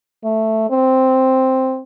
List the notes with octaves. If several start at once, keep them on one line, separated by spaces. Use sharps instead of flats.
A3
C4